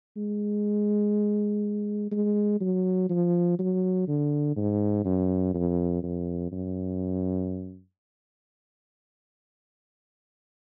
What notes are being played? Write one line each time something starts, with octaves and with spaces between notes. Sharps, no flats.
G#3
G#3
F#3
F3
F#3
D3
G#2
F#2
F2
F2
F#2